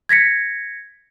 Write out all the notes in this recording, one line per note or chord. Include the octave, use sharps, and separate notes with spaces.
G#6 A#6 B6 C#7